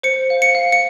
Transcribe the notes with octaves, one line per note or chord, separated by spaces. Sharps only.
C5 C#7
F5
C#7
F5
C#7